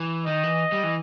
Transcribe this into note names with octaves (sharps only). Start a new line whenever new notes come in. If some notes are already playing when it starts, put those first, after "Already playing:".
Already playing: E3
D#3 D#5
E3
G3
E3